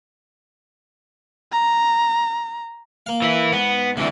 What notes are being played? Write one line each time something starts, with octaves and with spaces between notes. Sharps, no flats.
A#5
A#3 F5
E3 E4
G#2 B3
D2 C3 E3 G3